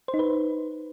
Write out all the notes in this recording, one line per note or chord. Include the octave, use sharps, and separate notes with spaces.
C5
D#4
B4